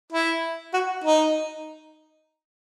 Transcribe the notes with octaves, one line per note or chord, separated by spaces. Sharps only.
E4
F#4
D#4